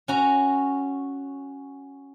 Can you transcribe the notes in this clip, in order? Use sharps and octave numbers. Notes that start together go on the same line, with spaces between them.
C#4 F#4 A#5